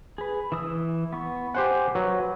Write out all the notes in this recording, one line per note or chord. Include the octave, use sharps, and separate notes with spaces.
G#4 B4
E3 D#6 E6
B3 C#6
G4 C5 F#5 G#5
F#3 B4